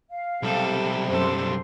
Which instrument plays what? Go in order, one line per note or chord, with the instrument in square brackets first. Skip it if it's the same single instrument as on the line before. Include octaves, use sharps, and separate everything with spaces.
[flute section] F5
[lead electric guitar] B1 G3 [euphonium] C3 [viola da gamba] A4
[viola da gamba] F#2 A4 [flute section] C5